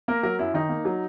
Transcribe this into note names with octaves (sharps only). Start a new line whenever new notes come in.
A#3 A#4
F#3 A#4
F#2 E4
D#3 D#4
A#3
F#3